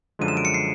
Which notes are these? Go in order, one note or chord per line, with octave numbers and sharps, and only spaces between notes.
F#2 D3 F3 G#3 D#7
E7
D7
C#7
C7